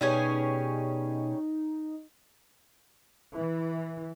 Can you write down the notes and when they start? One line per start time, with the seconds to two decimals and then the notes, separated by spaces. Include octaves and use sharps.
0.01 B2 G3 C#4 D#4 G#4 B4
3.36 E3